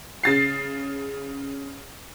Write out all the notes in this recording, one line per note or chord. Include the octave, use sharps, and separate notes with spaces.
C#3 A6 C7